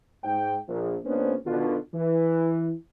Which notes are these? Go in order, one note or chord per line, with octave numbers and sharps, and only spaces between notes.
G#2 G5
A#1
C#2 A#3 B3 C#4 D4 C5
B2 D3 D#3 F4
E3